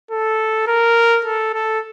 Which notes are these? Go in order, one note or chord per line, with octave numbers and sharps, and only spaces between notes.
A4
A#4
A4
A4